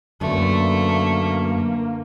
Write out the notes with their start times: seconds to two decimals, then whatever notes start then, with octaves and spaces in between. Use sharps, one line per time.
0.21 F#2 D3 A3 A#3 B4